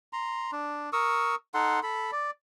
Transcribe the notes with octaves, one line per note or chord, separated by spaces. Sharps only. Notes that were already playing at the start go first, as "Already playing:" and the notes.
A#5 C6
D4
A#4 C#6 D#6 E6
D#4 A4 F#5 C6
A4 B5
D5